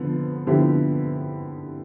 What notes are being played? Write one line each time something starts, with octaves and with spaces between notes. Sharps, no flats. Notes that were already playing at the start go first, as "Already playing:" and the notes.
Already playing: D3 F3 B3
D3 F3 B3 E4 G4